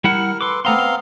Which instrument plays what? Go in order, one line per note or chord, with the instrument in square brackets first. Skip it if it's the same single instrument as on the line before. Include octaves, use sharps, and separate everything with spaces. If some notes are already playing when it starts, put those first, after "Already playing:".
[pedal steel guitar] G3 E4 F#5 [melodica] A#4
[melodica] A4 B4 [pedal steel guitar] C6 D6
[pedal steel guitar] A3 A#5 C6 [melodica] B3 C4 F5
[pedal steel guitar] A#5 C6